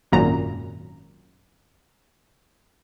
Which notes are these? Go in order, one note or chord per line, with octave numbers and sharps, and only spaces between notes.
G#1 F#2 A#2 A#5